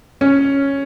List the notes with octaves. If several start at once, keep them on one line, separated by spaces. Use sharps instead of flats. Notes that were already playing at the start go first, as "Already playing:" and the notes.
C#4